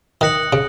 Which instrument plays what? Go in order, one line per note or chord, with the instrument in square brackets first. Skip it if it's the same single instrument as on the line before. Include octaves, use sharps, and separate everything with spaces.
[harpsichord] D#3 [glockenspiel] D#6 F#6 A#6 C#7 F#7
[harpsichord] C#3